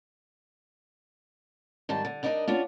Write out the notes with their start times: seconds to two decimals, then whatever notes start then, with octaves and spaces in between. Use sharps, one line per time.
1.89 G#2 D#3 G3 A5
2.05 D3
2.23 G2 D4 D#4 A#4 D5 D#5
2.48 B3 C#4 D4 F4